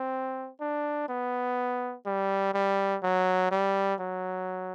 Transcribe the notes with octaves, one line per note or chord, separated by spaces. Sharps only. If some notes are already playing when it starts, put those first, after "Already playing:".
Already playing: C4
D4
B3
G3
G3
F#3
G3
F#3